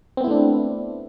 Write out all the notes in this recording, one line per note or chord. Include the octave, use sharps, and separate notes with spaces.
A3 B3 C4 D4 E4